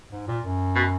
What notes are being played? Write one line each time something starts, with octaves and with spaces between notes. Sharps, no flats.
G#2
A#2
F#2
B2